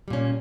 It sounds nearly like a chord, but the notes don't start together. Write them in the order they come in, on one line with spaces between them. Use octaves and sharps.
G3 A#2 C#4